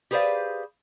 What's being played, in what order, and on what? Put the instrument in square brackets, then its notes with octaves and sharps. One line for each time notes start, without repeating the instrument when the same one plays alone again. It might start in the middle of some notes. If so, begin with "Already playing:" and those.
[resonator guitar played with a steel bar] G4 G#4 B4 C5 D5 F5